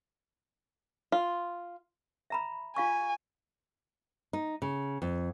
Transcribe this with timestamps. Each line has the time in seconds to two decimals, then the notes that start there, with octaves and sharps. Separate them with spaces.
1.12 F4
2.30 E5 A#5 B5
2.76 F4 F5 G#5 C#6
4.33 D#4
4.62 C#3
5.02 F2